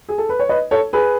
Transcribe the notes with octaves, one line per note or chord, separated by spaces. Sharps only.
G#4
A4
B4
C#5
B4 D#5
A4 C#5
G#4 B4